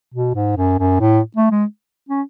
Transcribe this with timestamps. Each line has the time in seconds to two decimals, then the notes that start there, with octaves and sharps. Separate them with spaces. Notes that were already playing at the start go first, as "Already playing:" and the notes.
0.14 B2
0.35 G#2
0.57 F#2
0.79 F#2
1.00 A2
1.36 A3
1.52 G#3
2.09 C#4